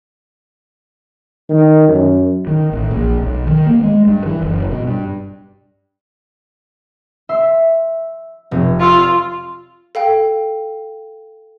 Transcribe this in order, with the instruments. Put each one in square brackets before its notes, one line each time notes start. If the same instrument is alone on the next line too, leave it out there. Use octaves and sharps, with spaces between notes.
[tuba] D#3
F#2
[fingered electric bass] D#3
A1
A#1
B1
D#3
A#3
G#3
G2
E3
F#1
B2
G2
[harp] E5 C6 E6
F1
[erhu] F4 [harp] C#6 E6
[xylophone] A4 F5 G5